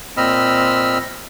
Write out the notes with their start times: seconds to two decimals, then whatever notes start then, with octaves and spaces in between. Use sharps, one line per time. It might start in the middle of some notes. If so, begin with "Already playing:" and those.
0.17 A#2 C4 D#5 B5 E6 F6